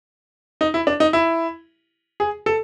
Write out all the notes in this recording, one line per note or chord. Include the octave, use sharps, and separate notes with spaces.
D#4
E4
D4
D#4
E4
G#4
A4